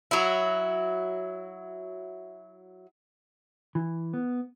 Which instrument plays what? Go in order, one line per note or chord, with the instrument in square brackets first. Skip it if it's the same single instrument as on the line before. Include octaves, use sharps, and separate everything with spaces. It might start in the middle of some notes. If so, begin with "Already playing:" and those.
[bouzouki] F#3 E4
[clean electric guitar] E3
B3